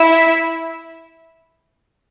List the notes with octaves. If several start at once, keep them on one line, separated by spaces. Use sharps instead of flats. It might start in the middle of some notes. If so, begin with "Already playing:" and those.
Already playing: E4 E5